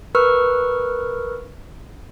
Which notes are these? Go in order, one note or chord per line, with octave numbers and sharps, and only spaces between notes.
A#4 B4 C#6 E6 F6